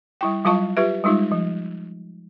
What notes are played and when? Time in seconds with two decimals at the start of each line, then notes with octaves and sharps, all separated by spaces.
0.21 G3 E4 G5
0.45 F#3 G3 F4 F5 A5 C#6
0.77 F4 G4 B4 E5
1.04 G3 G#3 D#4 F4
1.32 F3